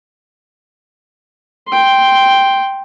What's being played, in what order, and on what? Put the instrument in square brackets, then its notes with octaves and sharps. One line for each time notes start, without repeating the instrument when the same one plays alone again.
[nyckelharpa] G5 C6